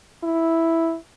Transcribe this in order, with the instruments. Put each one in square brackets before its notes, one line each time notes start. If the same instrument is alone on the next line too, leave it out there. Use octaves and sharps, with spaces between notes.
[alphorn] E4